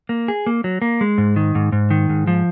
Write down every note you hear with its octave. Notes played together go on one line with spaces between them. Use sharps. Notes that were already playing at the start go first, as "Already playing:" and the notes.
A#3
G#4
A#3
F#3
A#3
G#3
G#2
D#3
G#2
G#2
D#3
G#2
F3